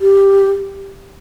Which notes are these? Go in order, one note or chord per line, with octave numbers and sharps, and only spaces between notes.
G4